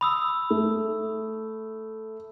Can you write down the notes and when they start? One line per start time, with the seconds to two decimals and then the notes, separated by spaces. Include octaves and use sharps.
0.01 B5 D#6 E6
0.50 A3